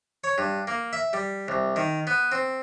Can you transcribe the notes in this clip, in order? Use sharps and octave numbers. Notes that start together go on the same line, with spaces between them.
C#5
G2
A#3
E5
G3
C2
D#3
B3
C4